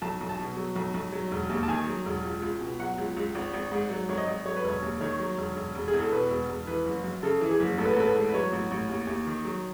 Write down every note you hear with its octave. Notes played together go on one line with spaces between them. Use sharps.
B1 A5
B1
A5
B2
F#3
B1
B1
F#3
E1
D#2
A5
D#3 G#5
F#3
E1
C#2
C#2
B2
F#3 F#5
C#2
C#2
G#1
G#1
G#2
F#3
G#1 C#5
D#5
G#1
F#3 C#5
B4
E1 C#5
D#2
D#3 C#5
F#3
E1
E1
E1
G#4
E2
A4
B2 B4
E1
E1
E3 B4
F#1
F#2
C#3 A4
E3
G#4
F#1
A1 A4
B4
A4
A1 B4
A4
G#2
B4
F#3 C#5
A1
A1
D#2
D#2
D#3
F#3